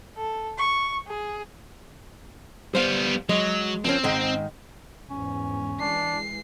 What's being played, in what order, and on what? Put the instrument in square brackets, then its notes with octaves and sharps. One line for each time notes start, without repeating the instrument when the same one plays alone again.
[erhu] A4
C#6
G#4
[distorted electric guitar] G3 B3 [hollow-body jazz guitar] C5 F5
[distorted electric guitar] F#3 [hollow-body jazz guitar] G#3
[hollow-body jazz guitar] F3 A#3 C#4 [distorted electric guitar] C4
[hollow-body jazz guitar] G#2 D#3 G#3
[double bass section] E2 G#2 [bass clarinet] C#4
[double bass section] E3 G#3 [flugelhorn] D4 [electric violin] C7